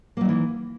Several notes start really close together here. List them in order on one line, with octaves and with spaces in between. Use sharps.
A#3 F#3 D#3 E3